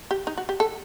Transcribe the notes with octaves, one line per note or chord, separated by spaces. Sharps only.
G4
D#4
F#4
G4
A4